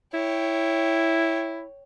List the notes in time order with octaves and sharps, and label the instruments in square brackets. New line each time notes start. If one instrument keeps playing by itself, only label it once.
[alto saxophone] E4 [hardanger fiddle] C#5 G5